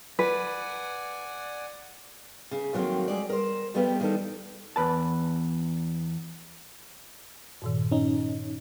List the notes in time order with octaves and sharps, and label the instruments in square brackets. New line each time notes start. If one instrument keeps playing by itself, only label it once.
[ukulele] B4 [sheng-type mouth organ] D5 F#5 G#5
[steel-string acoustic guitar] C#3
F2 D#3 F#3 A#3 C4
G3 G#3 D5
A#4 C5
F2 G3 A3 B3 G4 F5
D#3 E3 G3 D4 D#4 A4
[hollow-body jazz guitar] E2 B4 A5
[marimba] G2 A#2 D#3
[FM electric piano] C#4 D#4